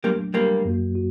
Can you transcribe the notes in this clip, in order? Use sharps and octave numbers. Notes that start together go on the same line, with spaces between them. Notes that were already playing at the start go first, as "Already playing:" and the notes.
F#3 G3 A3 A#3 D4
F#3 G3 A3 A#3 D4
F#2 F#3 A#3 F#4
F#4